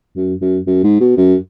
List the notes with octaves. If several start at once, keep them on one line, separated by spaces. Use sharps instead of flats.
F#2
F#2
F#2
G#2
B2
F#2